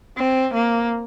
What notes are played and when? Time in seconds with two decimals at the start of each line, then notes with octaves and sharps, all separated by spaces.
0.17 C4
0.54 A#3